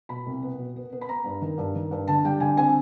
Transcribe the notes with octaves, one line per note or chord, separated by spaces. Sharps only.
B2 B5
C2
B3
B2
B3
B3
B5
B3 A#5
G2
D#3
G2
D#3
G2
D3 A5
G3 G5
D3 G#5
C4 G#5